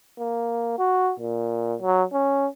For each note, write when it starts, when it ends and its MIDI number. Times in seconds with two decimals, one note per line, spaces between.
0.19 0.77 58
0.79 1.13 66
1.20 1.75 46
1.82 2.04 54
2.13 2.47 61